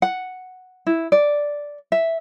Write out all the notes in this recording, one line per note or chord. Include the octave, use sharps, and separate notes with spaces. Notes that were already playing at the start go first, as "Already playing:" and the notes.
F#5
E4
D5
E5